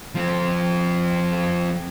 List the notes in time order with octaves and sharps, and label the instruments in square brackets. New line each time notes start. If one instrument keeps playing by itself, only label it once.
[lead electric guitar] F3 C4